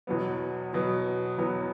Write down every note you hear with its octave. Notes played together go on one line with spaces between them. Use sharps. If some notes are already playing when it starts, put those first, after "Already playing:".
E2 B2 F#3 B3
E2 B2 F#3 B3
E2 B2 F#3 B3